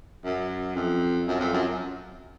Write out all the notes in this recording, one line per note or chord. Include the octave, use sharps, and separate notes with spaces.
F#2
F2
F#2
F2
F#2